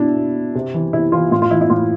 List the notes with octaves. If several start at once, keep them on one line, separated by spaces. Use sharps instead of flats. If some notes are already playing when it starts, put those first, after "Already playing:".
Already playing: B2 D4 E4
B2
C3
E3
C3 E4
E3 F4
A2 F4
F4
E3 E4
E4
A2 F4